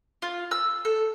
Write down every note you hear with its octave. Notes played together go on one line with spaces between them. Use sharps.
F4
E6
A4